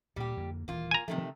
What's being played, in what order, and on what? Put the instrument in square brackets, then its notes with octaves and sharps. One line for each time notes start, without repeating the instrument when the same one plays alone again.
[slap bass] D2 A#2 [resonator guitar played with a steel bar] G3 G4
[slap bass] F2 D3 A#3
[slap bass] D#1 E3 [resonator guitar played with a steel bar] A#3 F4
[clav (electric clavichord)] G#5 A#5
[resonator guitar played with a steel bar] C3 D#3 A3 [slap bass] F3